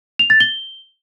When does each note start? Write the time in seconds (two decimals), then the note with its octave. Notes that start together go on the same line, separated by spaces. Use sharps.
0.19 F7
0.30 A6
0.40 G7